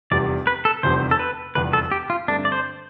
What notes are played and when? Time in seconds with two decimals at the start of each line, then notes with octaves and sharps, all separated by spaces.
0.11 F1 E2 C3 G3 D5
0.47 B4
0.65 A4
0.83 F1 E2 C3 G3 C5
1.11 A4
1.19 B4
1.55 F1 E2 C3 G3 B4
1.73 A4
1.92 G4
2.10 F4
2.28 G2 D3 A3 C4 D4
2.45 D5
2.52 C5